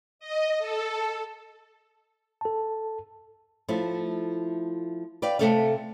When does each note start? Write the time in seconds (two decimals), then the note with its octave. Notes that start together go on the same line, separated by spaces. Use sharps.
0.19 D#5
0.59 A4
2.41 A4 A5
3.68 F3 A3 E4
5.22 B4 D5 F5 G5
5.39 C3 G3 A3 A4 E5 F5